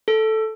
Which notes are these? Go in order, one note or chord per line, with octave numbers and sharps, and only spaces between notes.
A4